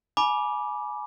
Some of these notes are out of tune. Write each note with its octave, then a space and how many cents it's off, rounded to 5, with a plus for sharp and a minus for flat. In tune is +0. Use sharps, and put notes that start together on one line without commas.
G#5 +25 B5 -30 D6 +0